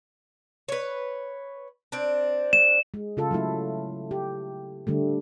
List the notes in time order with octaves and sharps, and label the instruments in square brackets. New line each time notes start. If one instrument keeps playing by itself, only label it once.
[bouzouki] B4 C#5
C4 D4
[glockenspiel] E7
[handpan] G#3
C#3 F4 A4
F#3 A3 E4
G4
D3 G3 A3